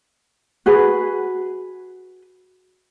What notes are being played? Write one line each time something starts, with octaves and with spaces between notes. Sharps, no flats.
F#4 G#4 B4